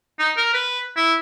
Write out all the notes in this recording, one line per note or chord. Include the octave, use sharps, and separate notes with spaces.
D#4
A#4
B4
E4